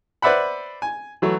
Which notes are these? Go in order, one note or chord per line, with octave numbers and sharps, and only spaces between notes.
B4 C5 D5 E5 F#5 B5
G#5
E3 F#3 A3